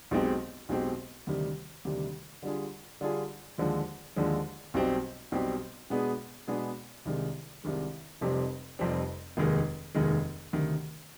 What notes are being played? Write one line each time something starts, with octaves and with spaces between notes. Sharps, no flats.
B1 B2 G#3 C4 G4
B1 B2 G#3 C4 G4
D2 C3 D#3 G3
D2 C3 D#3 G3
D3 G3 D4 F4 G#4
D3 G3 D4 F4 G#4
D#2 D3 F3 G#3
D#2 D3 F3 G#3
B1 B2 G3 C4 G4
B1 B2 G3 C4 G4
B2 G#3 B3 D4 G#4
B2 G#3 B3 D4 G#4
C2 C3 D#3 G#3
C2 C3 D#3 G#3
F1 F2 C3 G3 C4
F1 F2 C3 G3 C4
F1 D#2 D#3 G#3
F1 D#2 D#3 G#3
D2 C3 D#3